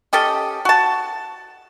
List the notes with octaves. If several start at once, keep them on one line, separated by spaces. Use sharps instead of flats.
C#4 G4 A4 D#5
F#4 A5